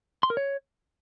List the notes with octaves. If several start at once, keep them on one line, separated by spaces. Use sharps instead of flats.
C6
A#4
C#5